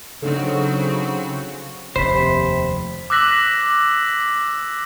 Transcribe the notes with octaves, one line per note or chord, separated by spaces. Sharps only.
C#3 F#3 C4 D4 D#4 F#4 A4
F1 D#2 C3 C5 B5 B6
D6 E6 F#6 A#6 B6 F#7